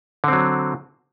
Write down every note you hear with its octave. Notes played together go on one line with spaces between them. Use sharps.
D3 F#3 C4